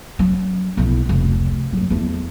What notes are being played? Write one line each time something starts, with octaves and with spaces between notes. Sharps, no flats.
F#3 C#4
B1 E4
F1 C#2
F#1 F#3
E2 A3